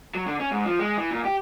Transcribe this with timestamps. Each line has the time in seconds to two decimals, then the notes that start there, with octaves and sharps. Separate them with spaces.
0.15 F#3
0.26 D3
0.40 C#4
0.52 G#2
0.65 F3
0.79 G#3
0.98 E3
1.11 A#2
1.25 G4